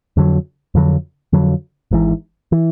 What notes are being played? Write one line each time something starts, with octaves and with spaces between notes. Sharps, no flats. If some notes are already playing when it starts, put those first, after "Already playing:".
F2 D3 F#3
F2 D3 F#3
F2 D3 F#3
G#1 G#2 E3
E3